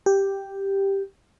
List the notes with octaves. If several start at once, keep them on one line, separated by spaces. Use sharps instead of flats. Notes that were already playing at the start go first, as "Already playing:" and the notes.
G4